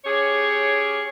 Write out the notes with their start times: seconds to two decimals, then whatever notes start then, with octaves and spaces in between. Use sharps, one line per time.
0.05 C#4 G4 G#4 C#5